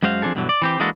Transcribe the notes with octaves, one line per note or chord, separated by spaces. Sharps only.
F#2 G#3 F#4 C5 F5
F3 C4 D4 G#4 A4
G2 B2 D3 E3 F#3
D5
E3 C4 G4
E3 G#3 A#3 D4 F#4 A4